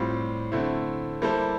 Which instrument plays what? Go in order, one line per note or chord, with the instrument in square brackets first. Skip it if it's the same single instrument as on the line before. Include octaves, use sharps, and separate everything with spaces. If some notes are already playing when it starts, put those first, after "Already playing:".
Already playing: [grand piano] A2 G3 C4 F4
D3 A3 C4 E4
G3 A#3 E4 A4 C5